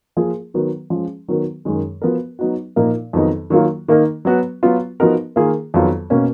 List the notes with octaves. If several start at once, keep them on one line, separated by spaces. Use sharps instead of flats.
F3 A#3 F4 G#4
D#3 F#3 B3 F#4 A#4
F3 G#3 C#4
D#3 F#3 B3 F#4 A#4
F#2 D#3 G#3
F3 B3 F#4 A#4
F#3 B3 D#4 F#4
A#2 F3 A#3 D#4 A#4
F2 D#3 F#3 B3 D#4
D#3 F#3 A#3 F4
D#3 A#3 D#4 A#4
F#3 B3 F#4
F#3 B3 F4
F3 B3 D#4 F#4 A#4
D#3 A#3 F4 G#4
F2 D#3 F#3 B3 F4
B2 A#3 C#4